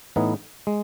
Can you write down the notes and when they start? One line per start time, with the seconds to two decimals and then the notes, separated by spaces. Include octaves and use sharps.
0.16 A2 E3 B3 D#4
0.67 G#3